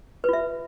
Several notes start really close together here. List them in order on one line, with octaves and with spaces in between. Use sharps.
B4 F4 E5